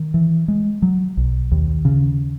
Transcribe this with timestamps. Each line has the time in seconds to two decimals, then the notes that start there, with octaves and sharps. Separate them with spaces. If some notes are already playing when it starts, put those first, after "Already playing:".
Already playing: D#3
0.14 E3
0.48 G#3
0.82 F#3
1.17 B1
1.52 D#2
1.85 C#3